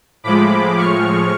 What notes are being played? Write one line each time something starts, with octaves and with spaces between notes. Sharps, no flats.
A2 F3 G#3 B5 D6
C#6 F6